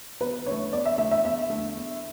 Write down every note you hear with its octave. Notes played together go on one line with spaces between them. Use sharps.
E2 B4
D3 A3 C#5
E2 D5
E5
D3 A3 E5
E5
E2 E5
D3 A3
E2